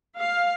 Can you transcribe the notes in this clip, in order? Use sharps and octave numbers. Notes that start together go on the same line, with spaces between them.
F5